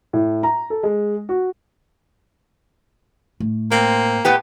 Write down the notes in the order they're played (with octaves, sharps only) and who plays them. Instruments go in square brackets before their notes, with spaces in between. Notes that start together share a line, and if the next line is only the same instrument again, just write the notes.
[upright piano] A2
A#5
A4
G#3
F#4
[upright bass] A2
[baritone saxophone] A#3 [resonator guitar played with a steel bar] C4
[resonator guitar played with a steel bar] A2 B3 G4